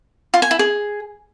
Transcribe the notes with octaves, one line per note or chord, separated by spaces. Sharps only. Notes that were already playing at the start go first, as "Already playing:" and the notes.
F4
G#5
E4
G#4